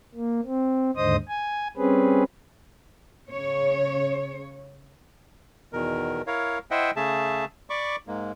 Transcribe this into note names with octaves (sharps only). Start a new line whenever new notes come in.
A#3
C4
D#2 G#2 D3 C5 D#5 D#6
G#5
G3 C4 C#4 G#4 B4
C#3 C#5
E2 B2 D#3 A#4
E4 A#4 C#5 F5
E4 C5 D#5 E5 F#5 G5
C#3 A3 G#4 E5 A5
D5 B5 C#6 D6
G#2 G#3 A#3